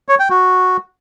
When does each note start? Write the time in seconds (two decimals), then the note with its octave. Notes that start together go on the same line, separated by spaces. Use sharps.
0.09 C#5
0.19 G5
0.30 F#4